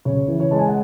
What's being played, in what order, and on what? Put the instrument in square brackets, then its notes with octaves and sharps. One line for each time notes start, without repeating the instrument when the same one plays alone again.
[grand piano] C#3 C#5
E3
C#5
G#3 A5
G#5
F#5